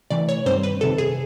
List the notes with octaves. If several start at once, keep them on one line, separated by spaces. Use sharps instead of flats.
C3 E3 A3 D5
C#5
G2 D#3 G3 C4 C5
B4
F2 C3 D#3 A4
G#4